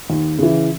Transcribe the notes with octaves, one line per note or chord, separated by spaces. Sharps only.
D#2
C#3 E3